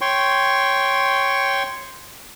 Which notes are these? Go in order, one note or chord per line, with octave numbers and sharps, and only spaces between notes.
C#5 G5 C6 C#6